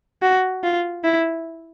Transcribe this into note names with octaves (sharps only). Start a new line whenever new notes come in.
F#4
F4
E4